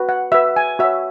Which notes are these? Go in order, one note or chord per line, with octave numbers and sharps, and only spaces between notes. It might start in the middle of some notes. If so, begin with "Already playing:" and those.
Already playing: F#4 B4
F#5
F#4 B4 E5
G#5
F#4 C#5 E5